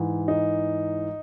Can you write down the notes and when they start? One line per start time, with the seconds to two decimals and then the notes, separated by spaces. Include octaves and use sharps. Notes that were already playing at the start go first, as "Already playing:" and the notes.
Already playing: G#2 E3
0.28 D#4